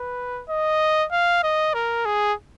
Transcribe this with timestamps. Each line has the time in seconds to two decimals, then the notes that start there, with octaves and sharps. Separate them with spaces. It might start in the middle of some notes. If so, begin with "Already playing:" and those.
Already playing: B4
0.49 D#5
1.11 F5
1.43 D#5
1.74 A#4
2.05 G#4